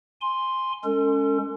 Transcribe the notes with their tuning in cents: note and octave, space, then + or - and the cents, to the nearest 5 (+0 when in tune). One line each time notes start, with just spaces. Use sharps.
G#5 -5 C6 +0
G#3 +0 C#4 +15 A4 +40